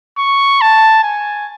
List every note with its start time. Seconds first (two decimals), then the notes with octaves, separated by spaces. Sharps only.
0.18 C#6
0.61 A5
1.03 G#5